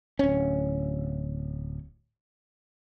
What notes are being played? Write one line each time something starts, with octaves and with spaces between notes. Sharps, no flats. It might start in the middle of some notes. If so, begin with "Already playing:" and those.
D1 C#4